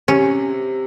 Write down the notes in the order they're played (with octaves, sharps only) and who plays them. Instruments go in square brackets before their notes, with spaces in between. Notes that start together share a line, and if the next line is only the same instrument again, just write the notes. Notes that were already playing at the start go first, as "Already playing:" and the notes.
[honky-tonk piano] C3 [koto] C#4